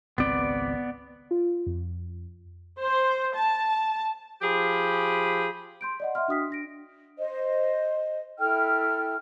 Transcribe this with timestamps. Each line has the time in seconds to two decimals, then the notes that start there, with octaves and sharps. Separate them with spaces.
0.18 G#1 C#2 B3 C4 D5
1.31 F4
1.66 F2
2.79 C5
3.35 A5
4.42 F3 G4 G#4 B5
5.81 C6 G6 D7
6.00 D5 D#5 F#5
6.15 E5 F#5 C6 F6
6.28 D4 F#4 G5 D#6 F6 B6
6.50 D4 A#6 D7
7.18 C5 D#5
8.39 E4 A4 G5 F6